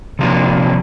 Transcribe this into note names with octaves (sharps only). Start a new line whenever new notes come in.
C3 F3 F#3 A#3 D4